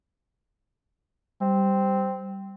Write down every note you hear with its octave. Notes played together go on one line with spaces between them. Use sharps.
G3 C4